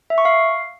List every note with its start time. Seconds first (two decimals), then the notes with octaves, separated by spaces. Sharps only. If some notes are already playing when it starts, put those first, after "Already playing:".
0.10 E5
0.18 C#6
0.25 F5